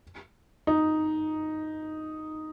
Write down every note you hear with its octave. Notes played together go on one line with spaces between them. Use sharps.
D#4